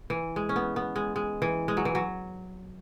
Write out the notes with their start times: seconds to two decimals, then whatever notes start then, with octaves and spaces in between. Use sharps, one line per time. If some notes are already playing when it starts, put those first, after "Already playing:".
0.10 E3
0.36 G#3
0.49 C#4
0.56 B3
0.76 B3
0.96 G#3
1.16 G#3
1.42 E3
1.68 G#3
1.77 F#3
1.85 E3
1.95 F#3